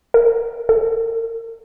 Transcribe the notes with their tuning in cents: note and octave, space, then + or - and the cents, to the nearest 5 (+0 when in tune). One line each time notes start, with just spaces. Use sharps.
A#4 +15
A#4 -35